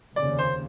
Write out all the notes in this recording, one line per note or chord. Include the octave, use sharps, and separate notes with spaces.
F1 D#2 C#3 D5
C5